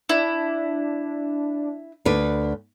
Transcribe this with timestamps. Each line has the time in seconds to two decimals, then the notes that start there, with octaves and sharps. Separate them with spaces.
0.09 D4 E4
2.05 D2 D4 B4